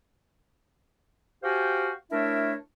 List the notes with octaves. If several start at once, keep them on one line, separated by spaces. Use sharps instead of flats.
F#4 G4 C5 F5 G5 G#5
A3 D4 E4 A#4 C#5 E5